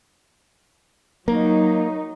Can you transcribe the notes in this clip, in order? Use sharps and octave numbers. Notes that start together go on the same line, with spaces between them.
F#3 A#3 D#4